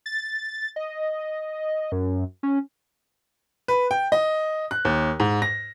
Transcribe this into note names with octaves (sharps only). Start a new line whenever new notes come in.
A6
D#5
F#2
C#4
B4
G5
D#5
F#6
D#2
G#2
A#6